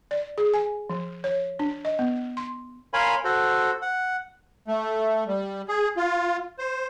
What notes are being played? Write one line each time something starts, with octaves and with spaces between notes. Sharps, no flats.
D5
G#4
G#5
F3
C#5
D4
D#5
B3
C6
A#4 C#5 F5 G#5 B5 C6
F#4 A4 C5
F#5
A3
G3
G#4
F4
C5